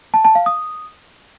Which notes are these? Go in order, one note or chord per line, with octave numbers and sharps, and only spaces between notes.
A5
A5
F5
D#6